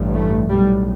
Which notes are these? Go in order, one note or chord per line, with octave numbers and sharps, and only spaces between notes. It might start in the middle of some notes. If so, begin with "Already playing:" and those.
Already playing: A1 G2
A3
B1 A2 G3